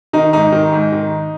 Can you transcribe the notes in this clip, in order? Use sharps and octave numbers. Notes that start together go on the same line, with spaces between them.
D#3 D#4
G#2 D#4
D#3
G#2
D#3